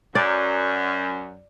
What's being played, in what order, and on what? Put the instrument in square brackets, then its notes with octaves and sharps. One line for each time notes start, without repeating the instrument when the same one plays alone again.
[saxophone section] F#2 [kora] D5